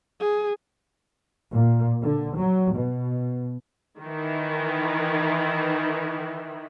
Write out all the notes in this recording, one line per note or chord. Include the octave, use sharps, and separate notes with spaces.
G#4
A#2
D3
F#3
B2
D#3 E3